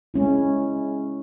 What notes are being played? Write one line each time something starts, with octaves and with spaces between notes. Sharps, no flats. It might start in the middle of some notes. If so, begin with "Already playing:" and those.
G#3 C#4 E4